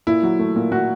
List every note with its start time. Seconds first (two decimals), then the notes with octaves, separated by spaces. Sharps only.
0.07 A#2 E4
0.23 F#3
0.39 A3
0.56 A#2
0.72 A#2 F#4